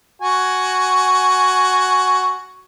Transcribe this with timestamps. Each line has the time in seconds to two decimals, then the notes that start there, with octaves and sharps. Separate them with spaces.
0.22 F#4 G#5